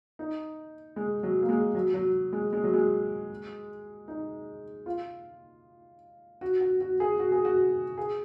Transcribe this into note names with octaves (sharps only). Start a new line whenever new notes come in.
D#4
G#3
F#3
A#3
G#3
F#3
F#3
G#3
G#3
F#3
G#3
D#4
F4
F#4
F#4
F#4
G#4
F#4
G#4
F#4
G#4